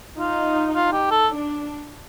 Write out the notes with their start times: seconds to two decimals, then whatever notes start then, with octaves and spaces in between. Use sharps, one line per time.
0.19 D#4 F4
0.74 F4
0.93 G4
1.11 A4
1.30 D4